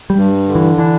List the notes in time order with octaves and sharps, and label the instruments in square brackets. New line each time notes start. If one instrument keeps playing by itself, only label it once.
[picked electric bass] G3
[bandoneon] G2
D3
[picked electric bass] E3
[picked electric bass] E3 [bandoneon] D4